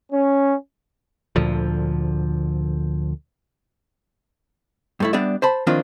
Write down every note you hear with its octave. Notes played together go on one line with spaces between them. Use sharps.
C#4
D2 A#2 D3 F3
G2 A3 E4
G3 B3 D4 G4 D5 E5
C5 A5 B5
D#3 F3 A#3 C4 D4 F4